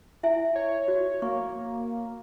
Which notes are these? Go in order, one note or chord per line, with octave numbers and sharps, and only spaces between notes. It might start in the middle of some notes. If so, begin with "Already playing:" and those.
E4 E5 G#5
C#5
F#4
A#3 C#6